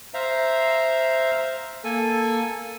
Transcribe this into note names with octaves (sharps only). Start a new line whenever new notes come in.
C5 E5 F5 A#5
A#3 A4 G#5